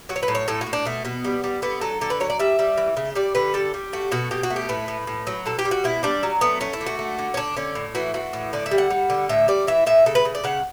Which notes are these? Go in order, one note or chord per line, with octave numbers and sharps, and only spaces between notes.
F#3 F#4
C#5
B4
A2
C#5
A2 A4
F#4
A2
D4
B2 A3
B2 B3
G3
G3
D3 B3
F#3 A4
D3 A4
B4
F#3 C#5
D5
G3 E5
G3
E3
C#3
G3 D5
D3 B4
G3 A4
G3
A3 F#4
B2 F#4
B2 G4
F#4
A3
G4
A2 B4
A2
A2
F#3
B2 A4
G4
G3
F#4
B2 E4
G3 D4
F#3
A3 B3
A3 C#4
E4
D3
F#4
A3
D3
C#4
D3 D4
D3 C#4
A2
E3 F#4
E3 F#4
A2
D3 D5
E5
G3
F#5
G3
D3
A2 E5
G3 D5
E3 E5
A2 E5
C#3 A4
B4
C#3
D5
C#3 F#5